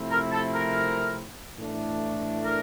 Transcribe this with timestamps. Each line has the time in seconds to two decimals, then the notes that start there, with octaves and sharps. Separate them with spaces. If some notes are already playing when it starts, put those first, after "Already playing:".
Already playing: C3 F3 A3 C4 E4
0.10 A#4
0.31 A4
0.53 A#4
1.59 A2 E3 A3 D4
2.44 A#4